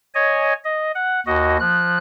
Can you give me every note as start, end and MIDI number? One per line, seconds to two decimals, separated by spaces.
0.15 0.53 73
0.15 0.53 75
0.15 0.53 80
0.64 0.92 75
0.95 1.20 78
1.26 1.57 39
1.26 1.57 66
1.26 1.57 75
1.60 1.98 53
1.60 1.98 90